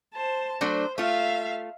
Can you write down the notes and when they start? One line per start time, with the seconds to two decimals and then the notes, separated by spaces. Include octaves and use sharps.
0.14 C5 A5
0.61 F#3 A3 D4 C5
0.98 A3 F4 E5 F5